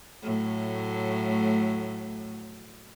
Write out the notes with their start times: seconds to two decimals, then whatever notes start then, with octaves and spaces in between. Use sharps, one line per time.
0.23 A2 F#3 A3